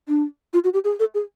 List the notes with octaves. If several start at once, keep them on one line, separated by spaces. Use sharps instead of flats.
D4
F4
F#4
G4
G#4
A4
G#4